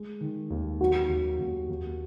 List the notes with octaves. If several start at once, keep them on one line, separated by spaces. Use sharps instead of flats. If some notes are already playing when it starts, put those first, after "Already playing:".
Already playing: G#3
D#3
D#2
F#3 F#4
D#2
D#2
D#2